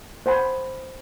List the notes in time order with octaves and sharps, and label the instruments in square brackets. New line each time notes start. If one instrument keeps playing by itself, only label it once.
[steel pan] C5 F#5 G#5 B5